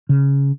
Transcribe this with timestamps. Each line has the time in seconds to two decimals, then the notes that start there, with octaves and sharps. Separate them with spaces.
0.09 C#3